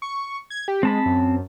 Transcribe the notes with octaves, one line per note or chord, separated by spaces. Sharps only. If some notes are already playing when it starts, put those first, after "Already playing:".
C#6
G#6
G4
G#3 C4 A5 B5
F#2